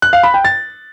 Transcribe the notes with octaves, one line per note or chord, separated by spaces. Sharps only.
F#6
F5
B5
G5
A6